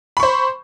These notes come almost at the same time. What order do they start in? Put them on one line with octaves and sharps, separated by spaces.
B5 C#6 C5